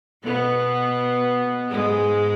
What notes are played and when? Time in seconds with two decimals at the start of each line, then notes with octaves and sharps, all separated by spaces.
0.25 B2 B3
1.70 G#2 G#3